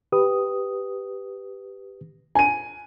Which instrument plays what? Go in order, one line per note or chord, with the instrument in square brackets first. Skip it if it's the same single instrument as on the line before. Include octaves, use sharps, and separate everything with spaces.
[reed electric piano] G4 B4 D#6
[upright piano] G#5 D#7